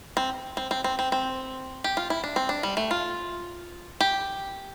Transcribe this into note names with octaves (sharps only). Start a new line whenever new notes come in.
C4
C4
C4
C4
C4
C4
G4
F4
E4
D4
C4
D4
G3
A3
F4
G4